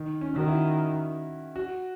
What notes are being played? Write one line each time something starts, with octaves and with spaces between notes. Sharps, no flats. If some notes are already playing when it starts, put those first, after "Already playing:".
Already playing: D#3
C#4
D#3 F#4
E4
F#4